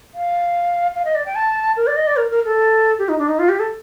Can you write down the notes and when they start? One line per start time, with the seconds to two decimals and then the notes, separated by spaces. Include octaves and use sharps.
0.15 F5
0.95 F5
1.05 D#5
1.15 D5
1.26 G5
1.35 A5
1.77 A#4
1.87 D5
1.97 D#5
2.07 D5
2.17 A#4
2.31 A#4
2.45 A4
2.99 G4
3.09 D#4
3.19 D4
3.28 D#4
3.39 F4
3.49 G4
3.60 A4